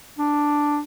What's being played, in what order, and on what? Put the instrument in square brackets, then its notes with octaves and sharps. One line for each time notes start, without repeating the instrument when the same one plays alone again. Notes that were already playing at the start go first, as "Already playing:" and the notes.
[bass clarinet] D4